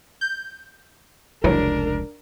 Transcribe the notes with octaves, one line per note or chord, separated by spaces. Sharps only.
G6
F1 C#2 C#3 E3 F#3 D4 A#4